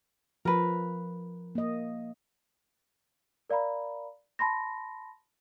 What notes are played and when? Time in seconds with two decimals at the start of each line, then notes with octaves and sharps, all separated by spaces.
0.45 F3 A#4 B4
1.55 A#3 D#5
3.50 A#4 D5 F5 A#5 B5
4.39 A5 B5 C6 A#6